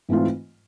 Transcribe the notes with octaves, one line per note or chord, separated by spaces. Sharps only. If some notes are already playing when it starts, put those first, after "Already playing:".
G#2 E3 A3 C4 F4